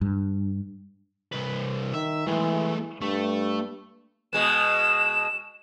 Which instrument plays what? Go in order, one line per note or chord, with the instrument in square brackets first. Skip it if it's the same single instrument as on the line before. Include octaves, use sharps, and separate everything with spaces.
[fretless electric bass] G2
[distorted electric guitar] C2 B4
[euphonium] D#3 [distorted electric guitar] E5
[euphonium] E3 [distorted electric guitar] G#3 A3
[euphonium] G2 [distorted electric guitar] A3
[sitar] B2 G#3 B3 [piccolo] E7